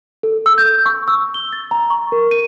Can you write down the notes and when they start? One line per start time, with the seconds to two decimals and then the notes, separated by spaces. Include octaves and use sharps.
0.23 A4
0.46 E6
0.58 G6
0.86 C#6
1.08 E6
1.34 G7
1.53 A6
1.71 A#5
1.90 C#6
2.12 A#4
2.31 D#7